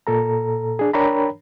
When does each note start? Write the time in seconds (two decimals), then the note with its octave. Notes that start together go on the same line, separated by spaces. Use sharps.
0.07 A#2 A4 A#5
0.79 D4 G#4
0.93 D4 A#4 C#5 G5 A#5 B5